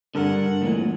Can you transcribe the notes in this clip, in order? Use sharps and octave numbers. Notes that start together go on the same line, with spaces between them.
G2 D3 G3 A4 A#4 F#5
D2 A#2 E3